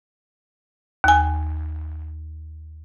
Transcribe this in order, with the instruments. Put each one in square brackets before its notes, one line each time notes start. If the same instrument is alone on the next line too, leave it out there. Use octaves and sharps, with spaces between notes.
[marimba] D#2 G#5